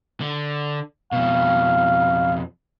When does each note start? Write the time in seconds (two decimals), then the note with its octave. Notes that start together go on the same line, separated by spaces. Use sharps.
0.21 D3
1.12 F2 B2 F5